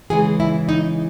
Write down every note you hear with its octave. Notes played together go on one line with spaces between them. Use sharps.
C#3 E3 G#3 G#4
E4
D#4